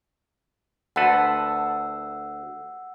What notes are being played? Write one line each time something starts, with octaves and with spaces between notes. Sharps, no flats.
D2 A4 B4 F#5 E6